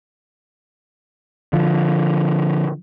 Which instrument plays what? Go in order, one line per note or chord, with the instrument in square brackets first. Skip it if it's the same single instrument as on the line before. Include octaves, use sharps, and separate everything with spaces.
[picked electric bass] D3 F3